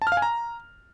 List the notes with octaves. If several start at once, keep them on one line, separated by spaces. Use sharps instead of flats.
A5
F6
F5
G#5
A#5